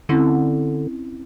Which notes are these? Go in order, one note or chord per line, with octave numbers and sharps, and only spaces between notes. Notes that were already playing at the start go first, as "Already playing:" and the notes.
D3 C4 C#4 E4